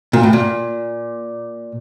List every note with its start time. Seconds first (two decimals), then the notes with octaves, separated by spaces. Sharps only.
0.13 A#2
0.23 A2
0.33 A#2